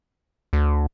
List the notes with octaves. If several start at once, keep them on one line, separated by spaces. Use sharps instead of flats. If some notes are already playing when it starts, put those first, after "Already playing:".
D2